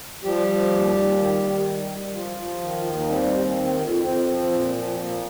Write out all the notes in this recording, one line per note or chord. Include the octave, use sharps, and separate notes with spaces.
F3 G3 G4
F3
D#2
D#2
D#3
D#3
G3
G3
F3 F4
F3
D#3
D#2
D#4
G3 C4
D#2
D#3
F2
F2 C4
F3
A#2
F3
A#2 A#3